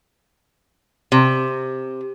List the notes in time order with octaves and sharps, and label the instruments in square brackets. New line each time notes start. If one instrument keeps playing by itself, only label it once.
[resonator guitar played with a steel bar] C3